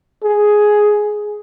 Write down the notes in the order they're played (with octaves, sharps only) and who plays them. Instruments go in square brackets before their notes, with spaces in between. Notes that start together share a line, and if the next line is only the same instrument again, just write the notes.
[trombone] G#4